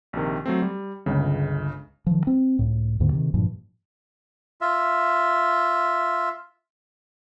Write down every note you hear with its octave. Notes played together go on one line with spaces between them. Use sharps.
A#1 C3 D#3
F#3 A3 C4
G3
G1 C#2 C#3
D#3 F3
C4
C#2 A2
D#2 G#2 D3 A#3
C3 D#3
G2 A#2 E3 F3
F4 E5